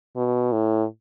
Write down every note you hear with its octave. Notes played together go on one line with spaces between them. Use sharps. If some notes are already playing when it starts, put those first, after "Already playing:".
B2
A2